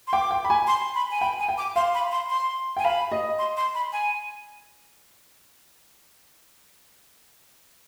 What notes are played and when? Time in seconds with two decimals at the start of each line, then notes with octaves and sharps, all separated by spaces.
0.07 C6
0.13 G5 D6
0.31 G5
0.45 B5
0.50 G#5
0.67 C6
0.95 B5
1.11 G#5
1.21 G5 B5
1.40 G#5
1.49 G5
1.58 D6
1.76 F5 C6
1.94 B5
2.11 C6
2.30 C6
2.77 G5 G#5
2.85 F5 B5
3.12 D#5
3.38 C6
3.57 C6
3.75 B5
3.93 G#5